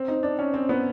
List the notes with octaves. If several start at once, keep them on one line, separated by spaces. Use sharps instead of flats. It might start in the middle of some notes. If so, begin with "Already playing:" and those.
Already playing: C4
D#4
D4
C#4
C4
B3